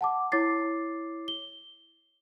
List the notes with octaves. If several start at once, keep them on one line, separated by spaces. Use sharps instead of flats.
F#5 A5 D6
E4 C#5 D6 A6 C7
G7